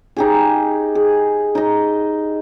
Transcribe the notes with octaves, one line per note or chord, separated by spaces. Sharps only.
D#4 G4 G#4
G#4
D#4 D#5